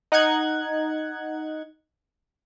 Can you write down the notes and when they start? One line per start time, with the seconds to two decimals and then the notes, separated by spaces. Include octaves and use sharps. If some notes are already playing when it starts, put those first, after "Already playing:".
0.12 D#4 F#5 F#6 G#6